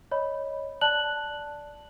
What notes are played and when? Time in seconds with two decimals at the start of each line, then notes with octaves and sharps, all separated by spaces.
0.11 C#5 D#5 B5
0.81 D5 A5 F#6 F#7